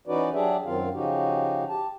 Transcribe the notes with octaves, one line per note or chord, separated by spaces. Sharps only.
E3 C#4 D#4 F#4 B4 D5
F#3 D4 G4 G#4 D5 E5
F#2 D#3 F#3 C4 F4 F5
C#3 F3 C#4 D#4 F#4 G4
G4 A5